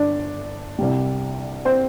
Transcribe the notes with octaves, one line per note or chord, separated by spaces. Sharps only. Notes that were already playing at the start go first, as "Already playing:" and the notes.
Already playing: G1 D4 D5
C2 C3 G3
C4 C5